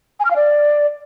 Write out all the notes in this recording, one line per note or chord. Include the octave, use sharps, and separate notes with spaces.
G#5
F6
F5
D5